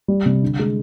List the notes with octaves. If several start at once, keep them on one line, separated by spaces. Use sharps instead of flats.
G3
C3
D3
G#3